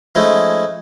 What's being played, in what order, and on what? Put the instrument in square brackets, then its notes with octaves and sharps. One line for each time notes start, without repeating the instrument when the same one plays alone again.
[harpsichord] F3 G#3 A3 C#4 D#4 E4